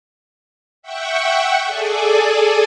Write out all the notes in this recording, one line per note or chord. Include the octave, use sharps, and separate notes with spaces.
E5 F#5 G5 C#6
G#4 A4 D5 G#5